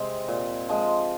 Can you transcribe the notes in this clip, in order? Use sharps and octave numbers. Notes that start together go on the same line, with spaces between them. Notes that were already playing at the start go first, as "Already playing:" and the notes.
Already playing: C3 G#3 C4
A#2
F3 G#3